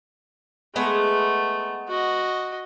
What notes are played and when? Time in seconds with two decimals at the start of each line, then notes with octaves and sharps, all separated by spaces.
0.76 G#3 A3 B3 F#5
1.89 F#4 D#5